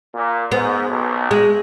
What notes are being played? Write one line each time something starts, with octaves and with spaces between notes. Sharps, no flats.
A#2
G#2 B3
B1
G#3